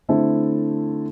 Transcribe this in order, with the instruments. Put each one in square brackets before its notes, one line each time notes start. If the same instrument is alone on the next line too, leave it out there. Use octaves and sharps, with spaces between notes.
[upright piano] D3 A3 C4 E4 A4